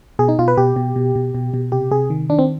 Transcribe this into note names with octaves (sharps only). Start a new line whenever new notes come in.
B2 G#4
D#4
B2 F4
B4
B2 G4
B2
B2
B2
B2
B2
C3 G4
C3 G#4
D#3
D#3 D4
C4